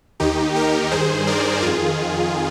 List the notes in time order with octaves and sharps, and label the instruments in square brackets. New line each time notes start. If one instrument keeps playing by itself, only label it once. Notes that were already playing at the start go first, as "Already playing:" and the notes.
[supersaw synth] D#2 D#3 D#4 G4
G4 A#4
G2 D#3 G#4 C5
A#4 D5
F2 D#3 F4 G#4